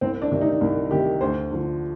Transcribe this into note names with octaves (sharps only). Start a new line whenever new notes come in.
C2 C4
D4
C3 D#3
D#4
C2
C3 D#3 G4
D2 C5
D3 F3